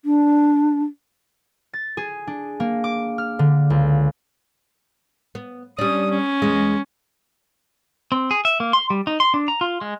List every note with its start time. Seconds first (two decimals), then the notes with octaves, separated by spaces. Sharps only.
0.05 D4
1.73 A6
1.97 G#4
2.27 D4
2.60 A#3
2.84 D6
3.18 F6
3.39 D3
3.70 C#2
5.35 B3
5.79 G3 C#4 D4 D#6
6.10 C#4
6.42 E2 G#3
8.12 C4
8.31 G#4
8.45 E5
8.60 A#3
8.73 C6
8.90 G3
9.07 D#4
9.20 C6
9.34 D4
9.48 A#5
9.61 F4
9.81 G#3